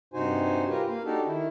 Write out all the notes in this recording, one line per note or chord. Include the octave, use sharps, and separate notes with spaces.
G2 C3 D#4 F#4 C5 G#5
F4 G4 A#4 B4
A#3 F5
D4 D#4 F#4 G4 A4
D#3 E4